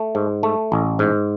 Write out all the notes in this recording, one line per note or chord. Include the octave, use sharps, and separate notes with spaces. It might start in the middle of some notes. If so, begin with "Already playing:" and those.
Already playing: A3
G#2
A3
A1
G#2